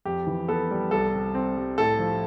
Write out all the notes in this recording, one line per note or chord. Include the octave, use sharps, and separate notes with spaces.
F2 G4
E3
B3 A4
G3
C2 A4
C3
C4
G3
A2 A4
F3